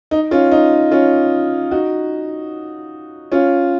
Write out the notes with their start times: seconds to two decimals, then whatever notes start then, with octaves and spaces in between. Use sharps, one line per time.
0.11 D#4
0.31 C#4 F4
0.51 D#4
0.91 C#4 F4
1.71 D#4 F#4
3.32 C#4 F4